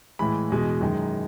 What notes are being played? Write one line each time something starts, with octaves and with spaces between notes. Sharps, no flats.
A2 E3 G#3 B5
E2 B2 G#3
F#2 D#3 G#3